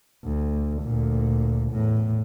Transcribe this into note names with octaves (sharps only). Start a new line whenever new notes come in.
D2
D2 A#2
E2 A2